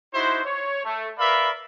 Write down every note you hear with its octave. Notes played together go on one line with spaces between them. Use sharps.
D#4 E4 F#4 C5
C#5
A3
A#4 B4 D5 E5 F5 B5